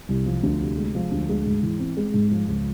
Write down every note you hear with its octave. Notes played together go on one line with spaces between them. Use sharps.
C2
F3
D2
C3
G#3
F3
D2
G#3
G#2
E3
C4
G#3
G#2
F3
C#2